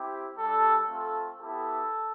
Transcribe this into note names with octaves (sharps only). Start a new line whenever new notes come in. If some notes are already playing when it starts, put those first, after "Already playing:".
Already playing: C4 E4 G4
G3 D4 G4 A4
A3 C4 F4 A4
B3 E4 G4 A4